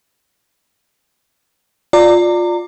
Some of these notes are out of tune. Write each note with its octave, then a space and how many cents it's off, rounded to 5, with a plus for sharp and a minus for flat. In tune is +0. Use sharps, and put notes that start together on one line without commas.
F4 +15 D5 +10 A#5 -30